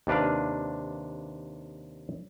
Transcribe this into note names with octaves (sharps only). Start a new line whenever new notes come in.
D#2 C3 D4 B4 F5